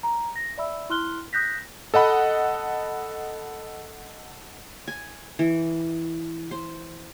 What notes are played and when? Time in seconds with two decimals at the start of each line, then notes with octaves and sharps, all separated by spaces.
0.03 A#5
0.36 A#6
0.58 D5 E5 B5 E6
0.90 E4 C6 F6 F#6 G7
1.33 D#6 F#6 G6 A#6 B6
1.94 A4 D#5 F#5 B5
4.88 G#5
5.39 E3
6.51 C5